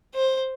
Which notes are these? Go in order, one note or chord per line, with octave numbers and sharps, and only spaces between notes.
C5